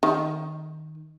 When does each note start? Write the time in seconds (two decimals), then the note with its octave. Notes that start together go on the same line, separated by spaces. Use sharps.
0.03 D#3